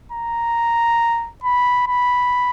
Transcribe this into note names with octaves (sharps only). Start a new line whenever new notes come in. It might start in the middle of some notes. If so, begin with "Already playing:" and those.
A#5
B5
B5